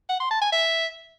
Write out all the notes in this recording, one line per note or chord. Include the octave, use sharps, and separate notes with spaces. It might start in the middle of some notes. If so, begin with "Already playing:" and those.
F#5
C6
A5
G#5
E5